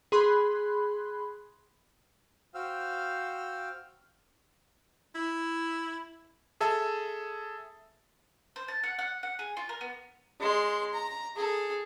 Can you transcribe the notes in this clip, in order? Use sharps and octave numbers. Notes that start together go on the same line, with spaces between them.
G#4 B5 C6 F#6
F#4 C5 F5 G5 E6 F6
E4
G#4 A4 E5 A5
C5
A5
F#5
F#5
F#5
G#4
F4
A#4
B3
G#3 C6
A#5
G#4 A4